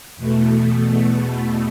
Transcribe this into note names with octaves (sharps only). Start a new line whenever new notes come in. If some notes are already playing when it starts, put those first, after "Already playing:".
E2 B2 A3